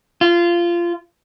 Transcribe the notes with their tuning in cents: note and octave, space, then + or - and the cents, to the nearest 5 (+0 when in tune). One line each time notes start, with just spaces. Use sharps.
F4 -20